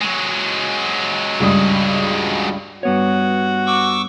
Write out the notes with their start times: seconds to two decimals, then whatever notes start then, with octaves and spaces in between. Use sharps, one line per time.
0.02 F#3 G#3
1.40 C#2 G2 D#6
2.83 G2 B3 F#4 C#5
3.66 C#6 D6 E6